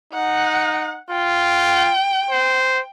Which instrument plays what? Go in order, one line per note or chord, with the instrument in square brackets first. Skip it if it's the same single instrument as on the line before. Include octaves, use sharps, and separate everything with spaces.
[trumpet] D#4 [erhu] F#5
[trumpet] F4 [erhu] G5
[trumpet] C5